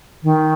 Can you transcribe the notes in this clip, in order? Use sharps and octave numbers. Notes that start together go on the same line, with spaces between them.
D#3